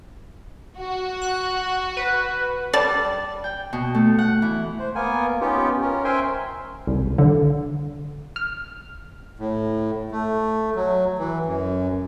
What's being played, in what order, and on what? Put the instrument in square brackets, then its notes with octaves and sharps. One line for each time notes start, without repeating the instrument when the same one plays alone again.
[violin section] F#4
[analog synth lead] F#6
B4
[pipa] G3 D5 A5
[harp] G5
B2
A3
F#5
E3
[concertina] C5
A#3 B3 A#4 G#5
B3 C#4 D#4 F4 G4
C#4 A#4
A#4 C5 E5 G5 G#5 C6
[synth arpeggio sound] C2
D3
F6
[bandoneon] A2
A3
F#3
E3
F#2